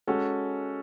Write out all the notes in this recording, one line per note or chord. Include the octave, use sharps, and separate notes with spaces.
G#3 C#4 F#4 A4